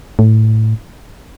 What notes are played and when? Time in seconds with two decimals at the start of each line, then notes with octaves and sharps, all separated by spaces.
0.19 A2